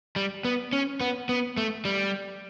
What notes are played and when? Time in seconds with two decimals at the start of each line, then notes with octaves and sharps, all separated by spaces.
0.16 G3
0.45 B3
0.73 C#4
1.01 B3
1.29 B3
1.57 A3
1.85 G3